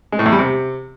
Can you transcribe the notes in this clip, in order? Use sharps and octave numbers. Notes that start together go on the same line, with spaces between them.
G#3
A2
E2
G3
C3